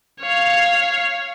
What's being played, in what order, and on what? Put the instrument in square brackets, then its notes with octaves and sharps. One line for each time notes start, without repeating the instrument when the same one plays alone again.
[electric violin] C#5 F5